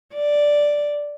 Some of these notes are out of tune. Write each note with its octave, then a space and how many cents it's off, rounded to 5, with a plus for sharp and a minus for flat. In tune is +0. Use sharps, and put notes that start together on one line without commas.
D5 +0